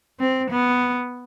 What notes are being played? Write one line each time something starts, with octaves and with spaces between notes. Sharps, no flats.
C4
B3